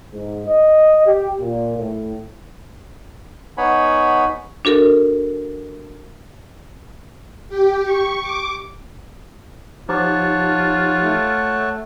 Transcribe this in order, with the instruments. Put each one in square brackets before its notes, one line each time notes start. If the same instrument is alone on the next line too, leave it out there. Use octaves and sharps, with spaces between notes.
[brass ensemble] G#2
D#5
G4
A#2
A2
[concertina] B3 D#4 C#5 F#5 G#5 B5
[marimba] D4 F#4 A4 A#4
[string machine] G4
C#6
D6
[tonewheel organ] F3 D#4 G4 [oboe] F4 [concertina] C#5 F#5 A5
[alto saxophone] A3